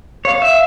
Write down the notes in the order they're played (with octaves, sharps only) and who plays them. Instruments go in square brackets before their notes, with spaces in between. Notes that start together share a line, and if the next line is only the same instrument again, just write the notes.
[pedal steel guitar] C#5 [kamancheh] F5
[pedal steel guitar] E5